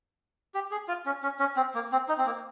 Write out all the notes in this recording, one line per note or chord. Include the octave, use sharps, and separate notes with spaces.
G4
G#4
F4
C#4
C#4
C#4
C4
A#3
C4
D#4
C4
A#3